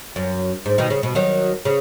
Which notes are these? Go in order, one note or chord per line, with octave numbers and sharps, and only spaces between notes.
F#2
G#2
B2 D#3
C#3
B2
D#3 F#3
C#3